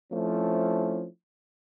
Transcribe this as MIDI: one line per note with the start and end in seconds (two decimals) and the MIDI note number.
0.12 1.07 53
0.12 1.07 57
0.12 1.07 60
0.12 1.07 61
0.12 1.07 64